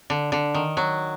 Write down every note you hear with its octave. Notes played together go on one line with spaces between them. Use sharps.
D3
D3
D#3
F#3